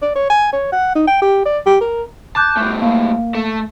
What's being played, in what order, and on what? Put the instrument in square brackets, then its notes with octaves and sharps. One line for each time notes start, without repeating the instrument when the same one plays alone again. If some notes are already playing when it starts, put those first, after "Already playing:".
[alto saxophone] D5
C#5
G#5
C#5
F#5
D#4
G5
G4
D5
G4
A#4
[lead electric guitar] A5 [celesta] D6 F#6 G6
[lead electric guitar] G2 A3
[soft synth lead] A#3 [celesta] F5
[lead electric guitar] A3